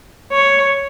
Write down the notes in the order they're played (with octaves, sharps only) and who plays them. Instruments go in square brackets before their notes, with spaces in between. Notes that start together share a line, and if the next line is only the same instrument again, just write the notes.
[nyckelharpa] C#5